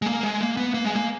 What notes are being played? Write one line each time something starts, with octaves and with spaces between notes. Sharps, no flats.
G#3
A#3
G#3
A#3
B3
A#3
G#3
A#3